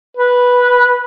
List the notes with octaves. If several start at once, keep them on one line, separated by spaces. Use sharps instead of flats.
B4